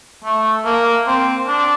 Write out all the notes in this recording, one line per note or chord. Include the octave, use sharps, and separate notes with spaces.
A3
A#3
C4
D4